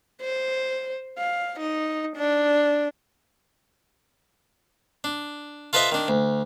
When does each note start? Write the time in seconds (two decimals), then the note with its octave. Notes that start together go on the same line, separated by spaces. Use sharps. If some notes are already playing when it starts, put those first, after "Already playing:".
0.21 C5
1.18 F5
1.59 D#4
2.16 D4
5.04 D4
5.73 F4 A4 B4 C5 D#5 E5
5.92 D#3 D4
6.08 D2